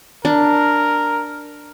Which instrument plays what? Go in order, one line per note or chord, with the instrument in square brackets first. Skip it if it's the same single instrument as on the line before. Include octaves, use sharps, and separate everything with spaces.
[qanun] D4 [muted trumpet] A#4